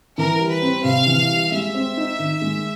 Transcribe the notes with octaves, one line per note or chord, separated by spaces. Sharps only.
E3 A#4
G3
B4
C4
C3 F5
E3
G3
G#3 E5
C4
D#4
D#3
G#3